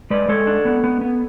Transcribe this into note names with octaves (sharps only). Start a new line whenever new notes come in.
G#3 B4 D5
G#3 A4 C#5
D4
B3
B3
B3